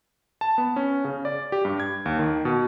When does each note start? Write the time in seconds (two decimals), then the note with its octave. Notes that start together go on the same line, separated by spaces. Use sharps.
0.41 A5
0.58 B3
0.76 C#4
1.05 C#3
1.25 D5
1.52 G4
1.65 G2
1.80 G#6
2.06 D#2
2.19 D#3
2.45 B2